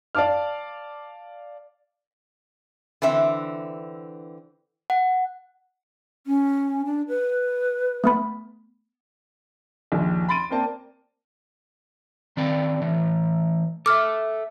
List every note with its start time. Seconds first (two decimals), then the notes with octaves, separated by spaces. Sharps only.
0.15 D5 F5 A5 D6 F6
3.02 D3 E3 C4 E5
4.90 F#5
6.27 C#4
6.85 D4
7.08 B4
8.04 A3 B3 B5
9.92 A#1 D#2 A#2 D#3
10.28 B5 C6 A6 D7 D#7
10.50 A#3 C4 A#4 C5 D5 A5
12.37 D#3 C4 D5
12.82 E3 A3
13.86 A4 E5 D6 F6